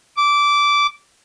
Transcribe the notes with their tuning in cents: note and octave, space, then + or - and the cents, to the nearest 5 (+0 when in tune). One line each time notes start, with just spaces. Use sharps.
D6 -15